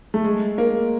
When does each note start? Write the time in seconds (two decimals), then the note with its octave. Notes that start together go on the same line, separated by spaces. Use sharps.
0.14 A3
0.24 G#3
0.58 A#3